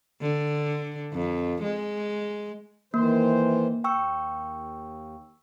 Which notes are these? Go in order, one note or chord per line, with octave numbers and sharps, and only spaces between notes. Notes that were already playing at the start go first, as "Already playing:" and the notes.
D3
F2
G#3
D#3 E3 A#3 C5
D#2 G5 C#6 E6